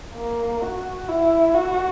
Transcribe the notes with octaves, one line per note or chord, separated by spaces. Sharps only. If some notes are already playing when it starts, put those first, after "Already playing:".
A#3
F#4
E4
F#4